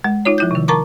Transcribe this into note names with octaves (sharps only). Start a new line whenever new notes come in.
G#3
D#4 F4 C#5
F3 E4 G6
C3 D#3
A#4 A5 A#5 C#6 D6